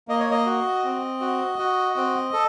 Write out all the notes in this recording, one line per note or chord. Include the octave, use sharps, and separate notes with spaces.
A#3 D#5
C#5
D#5
F#4
C4
F#4
F#4
C4
A4